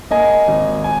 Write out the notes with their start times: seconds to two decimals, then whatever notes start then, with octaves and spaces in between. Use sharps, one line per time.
0.11 A#3 D#5 G#5
0.48 G#1
0.84 G#5